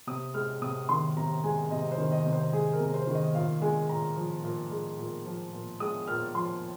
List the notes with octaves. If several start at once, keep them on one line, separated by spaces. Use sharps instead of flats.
C3 D#6
G#3 F6
C3 D#6
D#3 C6
C3 A#5
G#3 G#5
C3 D#5
C5
D#3
D#5
C3
C5
G#3 G#4
A#4
C3
C5
D#3
D#5
A#2 F5
G#3 G#5
A#2 A#5
F3
A#2
G#3
A#2
F3
A#2
G#3 D#6
A#2 F6
F3 C6